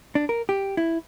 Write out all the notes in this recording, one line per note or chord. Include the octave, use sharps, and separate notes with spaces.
D4
A#4
G4
E4